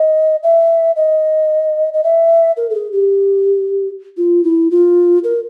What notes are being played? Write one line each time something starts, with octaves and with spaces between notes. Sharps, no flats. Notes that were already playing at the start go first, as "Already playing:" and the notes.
Already playing: D#5
E5
D#5
D#5
E5
A#4
A4
G#4
G4
F4
E4
F4
A#4